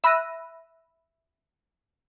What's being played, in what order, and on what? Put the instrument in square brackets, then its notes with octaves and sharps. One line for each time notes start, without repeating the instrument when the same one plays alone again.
[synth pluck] E5 B5 E6 F#6 A#6 D#7